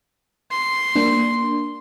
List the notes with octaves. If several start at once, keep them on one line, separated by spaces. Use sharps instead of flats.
C6
A#3 D4